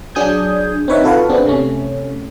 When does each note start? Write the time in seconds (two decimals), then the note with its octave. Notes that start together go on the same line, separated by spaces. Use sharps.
0.15 F#3 D4 G#4 D#6 G6 G#6
0.88 C4 D#4 B4 C#5 E5
1.03 F4 F#4 A4 B4 F5 F#5
1.29 B3 C4 D4 G#4
1.46 C3 A3 C#4